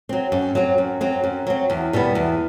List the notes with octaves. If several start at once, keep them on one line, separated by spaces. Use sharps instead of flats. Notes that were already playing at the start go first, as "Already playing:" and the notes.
F#3 C4
F#2
F#3 C4
F#2
F#3 C4
F#2
F#3 C4
E2
B2 G3 B3
E2